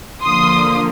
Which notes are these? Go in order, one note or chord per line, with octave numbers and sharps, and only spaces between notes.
D3 F3 A#3 C6 D#6